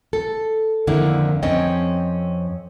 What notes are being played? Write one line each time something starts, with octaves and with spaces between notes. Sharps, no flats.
A4
F2 D3 D#3 A#3 E4
F2 C4 C#4 D#5